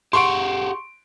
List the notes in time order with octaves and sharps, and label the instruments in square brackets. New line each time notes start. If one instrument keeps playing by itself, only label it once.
[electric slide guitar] G4 G#4 F#5 [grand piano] C6 C#6 D7